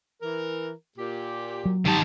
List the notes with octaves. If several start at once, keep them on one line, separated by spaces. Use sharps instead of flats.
E3 A#4
A#2 G4
F#3
D#3 D#4 G4 A5